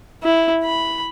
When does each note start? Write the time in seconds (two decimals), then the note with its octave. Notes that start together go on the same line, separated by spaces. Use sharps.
0.23 E4
0.63 B5